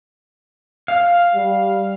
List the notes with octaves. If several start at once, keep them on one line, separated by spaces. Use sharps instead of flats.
F5
G3